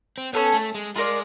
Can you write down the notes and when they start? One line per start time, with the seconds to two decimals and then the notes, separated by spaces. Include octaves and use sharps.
0.18 C4
0.33 B3 C#4 F4 A4 C#5
0.54 A3
0.75 G#3
0.96 G#3 F4 A#4 D5